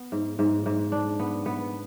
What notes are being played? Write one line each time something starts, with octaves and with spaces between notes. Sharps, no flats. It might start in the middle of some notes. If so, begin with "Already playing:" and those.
Already playing: B3
G#2
G#2
G#2
D4
B3
B3